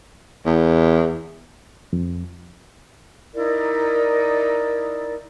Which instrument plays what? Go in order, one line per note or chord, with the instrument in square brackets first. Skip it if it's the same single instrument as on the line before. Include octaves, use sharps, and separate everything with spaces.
[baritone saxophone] E2
[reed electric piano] F2
[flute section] D#4 E4 A#4 D5